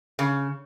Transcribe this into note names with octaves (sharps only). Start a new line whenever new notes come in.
C#3